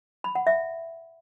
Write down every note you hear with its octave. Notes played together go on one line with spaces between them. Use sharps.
B5
F#5
E5